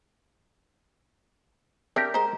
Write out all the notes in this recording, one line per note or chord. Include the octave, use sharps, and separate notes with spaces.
C4 D4 G4 A#4 E5
G#3 C5 A#5